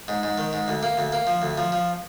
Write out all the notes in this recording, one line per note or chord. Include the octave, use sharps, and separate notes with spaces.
G#2
G#2
D#3
G#2
D2
A#3
D2
A#3
F3
D2
F3
F3